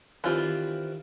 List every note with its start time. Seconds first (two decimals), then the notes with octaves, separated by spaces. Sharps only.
0.24 D#3 E3 G3 C4 F4